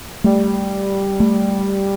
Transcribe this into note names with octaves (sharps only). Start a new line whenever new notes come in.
G3 A3
A3